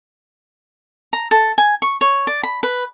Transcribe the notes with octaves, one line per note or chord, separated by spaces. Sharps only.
A#5
A4
G#5
C#6
C#5
D5
B5
B4